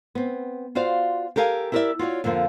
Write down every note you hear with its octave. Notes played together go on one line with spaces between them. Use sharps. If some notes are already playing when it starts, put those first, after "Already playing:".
B3 C4
F4 F#4 C5 D5 F5
G4 A4 A#4 F5 G#5
E4 G4 A#4 C5 D5 E5
F4 F#4 C#5 D5
F2 D3 F3 A#3 F4